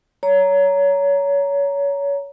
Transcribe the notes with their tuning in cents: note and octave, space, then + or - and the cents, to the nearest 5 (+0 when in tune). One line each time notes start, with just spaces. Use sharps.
C#5 +20 A#5 +0